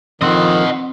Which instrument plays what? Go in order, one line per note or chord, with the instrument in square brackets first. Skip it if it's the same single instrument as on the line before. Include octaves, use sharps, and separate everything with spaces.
[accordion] F2 D#3 [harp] C4 [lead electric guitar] D#5 F#5